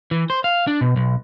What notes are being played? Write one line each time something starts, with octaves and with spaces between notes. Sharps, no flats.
E3
C5
F5
D4
B2
B1